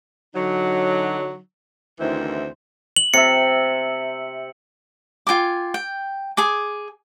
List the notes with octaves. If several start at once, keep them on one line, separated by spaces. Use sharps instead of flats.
D3 F#3 D#4
D2 D#3 E3 C4 E4 C5
F#7
C3 E5 C#7
F4 G5 G#5 D6
G5
G#4 G#5 D6